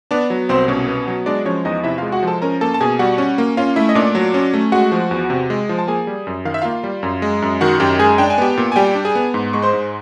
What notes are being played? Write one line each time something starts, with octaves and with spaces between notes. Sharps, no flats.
B3 D4 D5
F#3
C2 C4 C5
B2 C#4 C#5
B3
F#3
G#3 D4 D5
F3 C#4 C#5
E2 D#4 D#5
C3 E4 E5
G#3 F4 F5
F#4 F#5
F3 A4 A5
C#4 A#4 A#5
A#3 A4 A5
A5
B2 G#4 G#5
G3 F#4 F#5
C#4
A#3
C#4 F4 F5
A3 E4 E5
D#5
A#2 D4 D5
F#3
C#4
A3
G#3 F#4 F#5
F3
E2
C3
G#3
F3
A5
A#3 G#4 G#5
G3
F#2
D#3 F5
E5
A#3 F4 F5
G3
F#2
G#3
F#2
D#3 F#4 F#5
F#2 G4 G5
G#3 G#4 G#5
D4 G5
G#5
B3 G4 G5
A#2
G#5
G3 G4 G5
D4
G#4 G#5
B3
G#2
G#3 C#6
C5 C6
G#2